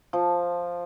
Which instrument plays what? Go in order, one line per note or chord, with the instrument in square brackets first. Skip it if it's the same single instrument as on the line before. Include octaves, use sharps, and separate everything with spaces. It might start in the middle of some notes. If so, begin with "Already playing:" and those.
[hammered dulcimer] F3